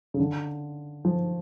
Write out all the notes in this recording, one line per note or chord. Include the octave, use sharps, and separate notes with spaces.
C#3
D3
F3